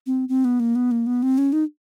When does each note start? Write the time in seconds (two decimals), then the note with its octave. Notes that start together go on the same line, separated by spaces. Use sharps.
0.06 C4
0.29 C4
0.45 B3
0.60 A#3
0.75 B3
0.91 A#3
1.07 B3
1.23 C4
1.38 C#4
1.53 D#4